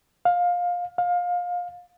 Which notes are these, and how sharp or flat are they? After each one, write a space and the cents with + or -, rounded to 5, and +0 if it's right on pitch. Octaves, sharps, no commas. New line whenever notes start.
F5 +20
F5 +25